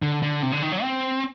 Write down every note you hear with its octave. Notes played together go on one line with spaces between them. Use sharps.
D3
D3
C3
D3
D#3
F#3
C4